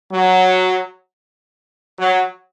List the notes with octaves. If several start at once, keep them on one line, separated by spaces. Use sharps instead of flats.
F#3
F#3